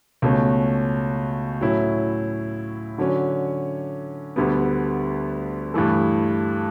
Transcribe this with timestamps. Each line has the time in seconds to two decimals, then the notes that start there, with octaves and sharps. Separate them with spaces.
0.22 C#2 B2 A3 C#4
1.61 A2 F#3 C#4 E4
2.98 D3 F#3 C#4
4.36 D2 D3 G3 B3
5.74 G2 E3 A3 E4 A4